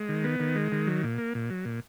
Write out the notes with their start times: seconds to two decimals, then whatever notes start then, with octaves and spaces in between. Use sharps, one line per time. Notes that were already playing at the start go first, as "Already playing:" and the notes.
Already playing: G#3
0.09 D#3
0.24 B3
0.40 D#3
0.56 G#3
0.72 D#3
0.87 F#3
1.03 A#2
1.18 A#3
1.35 A#2
1.50 F#3
1.65 A#2